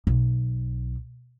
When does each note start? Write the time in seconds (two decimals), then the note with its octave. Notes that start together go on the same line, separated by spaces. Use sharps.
0.07 B1